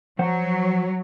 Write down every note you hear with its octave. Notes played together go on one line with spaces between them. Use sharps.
F3 F#3 C5 F#5